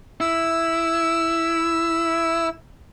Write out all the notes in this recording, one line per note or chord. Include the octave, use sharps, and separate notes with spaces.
E4 E6